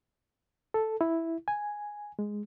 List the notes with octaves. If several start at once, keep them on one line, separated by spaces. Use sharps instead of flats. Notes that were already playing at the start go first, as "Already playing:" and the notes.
A4
E4
G#5
G#3